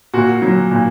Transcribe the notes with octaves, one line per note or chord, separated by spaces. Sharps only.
A#2 F#4
F#3
A#2